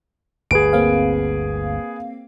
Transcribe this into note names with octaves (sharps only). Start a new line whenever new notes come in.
G1 D2 G#4 B4 D7
A#3 C4 F5